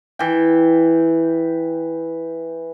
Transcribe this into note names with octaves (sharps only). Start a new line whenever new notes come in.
E3 G5